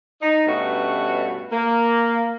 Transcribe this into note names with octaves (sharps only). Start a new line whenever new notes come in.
D#4
G2 B2 A3 C#4 F#4
A#3